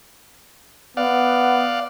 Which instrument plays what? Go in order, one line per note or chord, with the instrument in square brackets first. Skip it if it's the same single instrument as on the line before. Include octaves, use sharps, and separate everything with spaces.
[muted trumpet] B3 [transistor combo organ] D5 F5 F#5